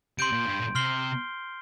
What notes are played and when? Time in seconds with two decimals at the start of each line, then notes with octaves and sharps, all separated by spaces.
0.18 C3 C6 G6 D7
0.32 A#2
0.45 G2
0.59 A#2
0.75 C3 C6 F6 C7 G7